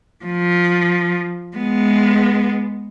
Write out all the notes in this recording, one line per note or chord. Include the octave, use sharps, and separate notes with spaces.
F3
G#3 B3